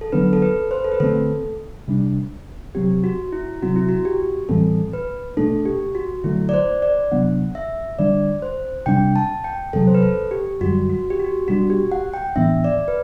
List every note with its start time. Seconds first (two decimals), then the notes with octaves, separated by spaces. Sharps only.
0.01 A4
0.12 D3 F#3 B3 D4 B4
0.33 A4
0.42 B4
0.71 C5
0.78 B4
0.84 A4
0.92 B4
1.00 D3 A3 C4 A4
1.88 C3 G3 D4
2.75 C3 F#3 C4 G4
3.04 F#4
3.32 E4
3.62 C3 F#3 C4 F#4
3.76 E4
3.89 F#4
4.05 G4
4.49 A2 E3 G3 C4 A4
4.93 B4
5.37 B2 A3 D4 A4
5.65 G4
5.95 F#4
6.24 D3 F#3 A3 E4
6.49 D5
6.54 C5
6.82 D5
7.11 C3 F#3 B3 D4 F#5
7.55 E5
7.99 D3 G3 D4 D5
8.42 C5
8.86 C3 G3 D4 G5
9.16 A5
9.44 G5
9.73 E2 C3 F#3 A4
9.87 C5
9.95 B4
10.03 A4
10.31 G4
10.61 F#2 D3 G3 F#4
10.89 F#4
11.10 G4
11.20 F#4
11.48 B2 G3 D4 F#4
11.70 G4
11.91 F#5
12.14 G5
12.36 A2 E3 B3 D4 E5
12.64 D5
12.88 B4